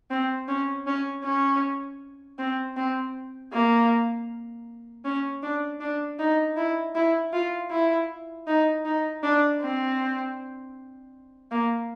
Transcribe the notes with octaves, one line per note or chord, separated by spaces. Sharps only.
C4
C#4
C#4
C#4
C4
C4
A#3
C#4
D4
D4
D#4
E4
E4
F4
E4
D#4
D#4
D4
C4
A#3